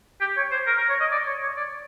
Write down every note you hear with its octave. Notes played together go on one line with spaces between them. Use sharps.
G4
C#5
C5
A#4
A#4
C#5
D#5
D5
C#5
C#5
D5